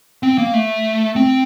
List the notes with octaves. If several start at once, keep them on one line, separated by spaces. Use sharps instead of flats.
C4
A#3
A3
C4